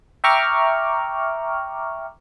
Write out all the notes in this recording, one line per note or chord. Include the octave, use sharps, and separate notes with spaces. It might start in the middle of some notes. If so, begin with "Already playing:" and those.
E5 G5 A#5 C#6 D6 F6